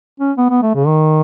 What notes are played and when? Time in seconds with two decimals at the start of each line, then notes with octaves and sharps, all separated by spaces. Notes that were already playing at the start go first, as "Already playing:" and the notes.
0.20 C#4
0.37 B3
0.50 B3
0.63 A3
0.75 C#3
0.87 D#3